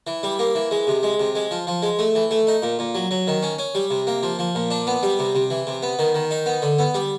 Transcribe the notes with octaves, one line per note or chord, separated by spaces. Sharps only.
E3
G3
A#3
E3
G#3
C3
G#3
C3
G#3
F3
F3
G#3
A3
E3
A3
D#4
A#2
A#2
F#3
F#3
D#3
C#4
C#4
G3
C3
A#3
F3
F3
A#2
D4
B3
G3
C3
C3
E3
C3
B3
D#3
D#3
D#4
B3
D3
B3
G3